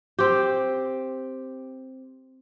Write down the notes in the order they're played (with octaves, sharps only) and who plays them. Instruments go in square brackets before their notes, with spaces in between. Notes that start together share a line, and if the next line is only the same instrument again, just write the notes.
[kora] C4 G4